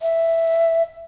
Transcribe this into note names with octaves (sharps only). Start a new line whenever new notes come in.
E5